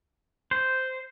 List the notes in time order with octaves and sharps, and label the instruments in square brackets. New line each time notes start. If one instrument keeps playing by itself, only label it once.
[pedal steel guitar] C5